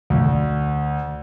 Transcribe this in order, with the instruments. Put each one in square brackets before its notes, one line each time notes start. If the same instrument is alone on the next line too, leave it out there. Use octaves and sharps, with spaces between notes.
[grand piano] D2